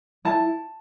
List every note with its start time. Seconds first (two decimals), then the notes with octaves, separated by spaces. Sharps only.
0.25 E4 A5